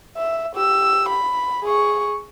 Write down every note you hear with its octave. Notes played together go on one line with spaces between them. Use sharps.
E5
G4 E6
B5
G#4 C#6